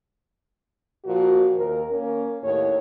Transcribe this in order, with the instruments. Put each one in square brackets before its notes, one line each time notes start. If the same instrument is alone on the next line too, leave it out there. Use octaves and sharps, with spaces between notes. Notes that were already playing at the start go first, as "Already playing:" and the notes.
[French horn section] A#2 F3 F#4
D#2 A#4
A#3 C#4 A#4
D#2 A2 C#5